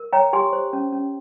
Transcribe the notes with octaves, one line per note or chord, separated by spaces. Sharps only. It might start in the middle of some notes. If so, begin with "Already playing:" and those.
Already playing: A#4
C#5 G5 A#5
G4 G#5 C6
C5
C#4
C#4